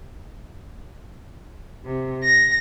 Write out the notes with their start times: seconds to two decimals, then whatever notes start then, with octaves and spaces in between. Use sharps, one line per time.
1.85 C3
2.24 A#6